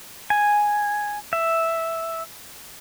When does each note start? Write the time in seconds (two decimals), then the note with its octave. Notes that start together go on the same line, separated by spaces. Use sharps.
0.30 G#5
1.33 E5